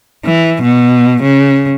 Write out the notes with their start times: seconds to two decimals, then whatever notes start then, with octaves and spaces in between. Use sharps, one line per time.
0.25 E3
0.62 B2
1.23 C#3